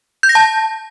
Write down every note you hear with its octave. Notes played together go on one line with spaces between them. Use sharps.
G6
A#6
A5